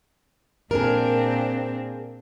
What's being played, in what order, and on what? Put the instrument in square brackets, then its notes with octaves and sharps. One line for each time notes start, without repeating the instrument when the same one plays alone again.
[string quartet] A#2 C4 D4 [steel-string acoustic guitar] G#4 A#4